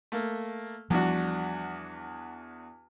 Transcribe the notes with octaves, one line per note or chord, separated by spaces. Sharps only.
A3 A#3
E2 F3 G3 D4 F#4